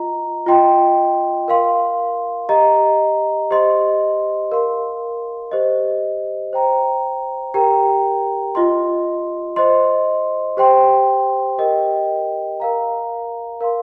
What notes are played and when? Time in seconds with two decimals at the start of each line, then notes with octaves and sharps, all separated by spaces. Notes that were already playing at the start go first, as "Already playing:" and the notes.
Already playing: F4 D#5 A#5
0.46 F4 D#5 G5 C6
1.48 A#4 F5 C6
2.49 G4 D#5 A#5
3.51 G4 C5 D#5 C6
4.52 A#4 F5 C6
5.52 G4 C5 D#5
6.53 C5 G5 A#5
7.54 G4 A#4 G5 A#5
8.55 F4 D#5 C6
9.56 C5 D#5 C6
10.57 G4 C5 G5 C6
11.58 G4 A#4 D#5 G5
12.60 A#4 F5 A#5
13.61 A#4 F5 C6